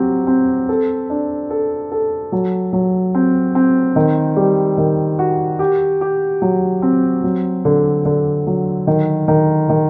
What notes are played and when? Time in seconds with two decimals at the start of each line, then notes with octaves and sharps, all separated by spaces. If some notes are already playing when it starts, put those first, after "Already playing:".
Already playing: F#3 C4 G4
0.27 C4
0.69 A4
1.10 D4
1.50 A4
1.92 A4
2.32 F#3
2.73 F#3
3.15 C4
3.55 C4
3.96 D#3
4.36 G3
4.78 D#3
5.19 F#4
5.59 G4
6.01 G4
6.42 F#3
6.82 C4
7.24 F#3
7.65 D3
8.05 D3
8.47 F#3
8.87 D#3
9.28 D#3
9.69 D#3